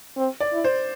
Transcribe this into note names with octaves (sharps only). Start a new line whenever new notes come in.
C4
D5
E4
C5